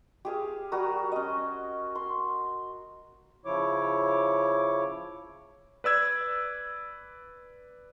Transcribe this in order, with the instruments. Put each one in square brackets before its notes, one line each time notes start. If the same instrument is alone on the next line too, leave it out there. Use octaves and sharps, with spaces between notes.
[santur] G4 G#4 F5
G3 F#4 A#4 D#6
C#4 D#5
C6
[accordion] C#3 F3 E4 C#5 D6
[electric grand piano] B4 D5 E6 G#6